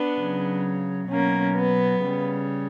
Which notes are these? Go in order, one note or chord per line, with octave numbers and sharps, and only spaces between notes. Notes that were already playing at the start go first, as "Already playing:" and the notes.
Already playing: B3 D4
C#3 F#3
B2 F#3 A#3 C#4
B3
C#3 G3